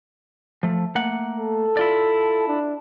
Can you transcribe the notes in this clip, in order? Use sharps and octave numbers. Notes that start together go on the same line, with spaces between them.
F3 A3
A3 A#3 F#5
A4
E4 F4 D5
D4